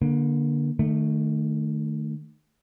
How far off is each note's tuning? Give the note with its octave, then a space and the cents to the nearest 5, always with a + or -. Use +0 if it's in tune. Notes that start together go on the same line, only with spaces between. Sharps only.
D3 +0 A#3 +25
D#3 -35 A3 +5